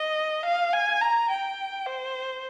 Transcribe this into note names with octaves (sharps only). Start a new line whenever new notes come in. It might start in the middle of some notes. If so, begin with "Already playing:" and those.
Already playing: D#5
F5
G#5
A#5
G5
C5